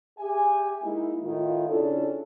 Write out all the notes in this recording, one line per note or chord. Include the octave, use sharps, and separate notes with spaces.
G4 G#4 E5 G#5
G#3 A#3 D#4 E4
A2 D#3 E4 F4
C#3 C#4 D4 E4 A4